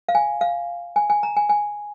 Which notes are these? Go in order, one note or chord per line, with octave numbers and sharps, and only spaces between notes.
F5
G#5
F5
G#5
G#5
A#5
G#5
G#5